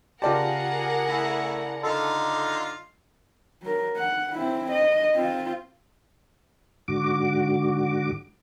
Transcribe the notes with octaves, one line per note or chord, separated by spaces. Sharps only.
C#3 F4 G4 G#4 A#4 D5 F#5 A5
A3 E4 B5
D3 D#4 F4 A4
F#3 A#4
F#5
C4 E4
D#5
C4 F4
G#2 D3 F#4 D6